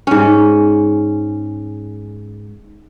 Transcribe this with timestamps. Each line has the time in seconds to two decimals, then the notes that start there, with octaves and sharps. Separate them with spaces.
0.07 G#2 C#4